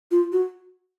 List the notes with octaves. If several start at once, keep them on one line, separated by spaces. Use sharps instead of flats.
F4
F#4